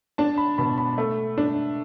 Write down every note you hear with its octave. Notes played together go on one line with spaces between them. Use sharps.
D4 A5
B5
B2 B5
B5
A3
D4